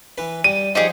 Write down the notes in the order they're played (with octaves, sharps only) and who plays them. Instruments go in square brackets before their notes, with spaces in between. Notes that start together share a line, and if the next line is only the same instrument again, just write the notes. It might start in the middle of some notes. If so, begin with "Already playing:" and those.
[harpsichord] E3 B4
[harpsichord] G3 [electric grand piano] D#7
[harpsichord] F3 [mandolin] D#4 G4 G#4